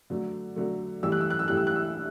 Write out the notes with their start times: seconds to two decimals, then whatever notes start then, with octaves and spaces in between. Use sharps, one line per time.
0.10 D3 F#3 A3
0.56 D3 F#3 A3
1.03 A2 E3 G3 E6
1.12 F#6
1.21 E6
1.30 F#6
1.39 E6
1.48 A2 E3 G3 F#6
1.57 E6
1.67 F#6
1.76 E6